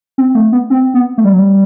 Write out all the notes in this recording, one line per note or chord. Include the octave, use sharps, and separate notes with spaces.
C4
A3
B3
C4
B3
A3
G3
F#3
G3